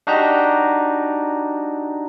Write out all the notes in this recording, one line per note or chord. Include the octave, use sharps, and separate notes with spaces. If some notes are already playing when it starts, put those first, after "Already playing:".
D4 D#4 F#4 G4 A#5